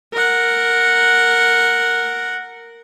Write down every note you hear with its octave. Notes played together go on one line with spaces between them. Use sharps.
A#4 F#5